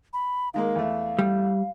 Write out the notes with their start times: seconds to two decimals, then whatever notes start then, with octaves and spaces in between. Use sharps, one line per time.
0.13 B5
0.54 D#3 G#3 A#3 F5
0.76 E2 A3
1.19 G3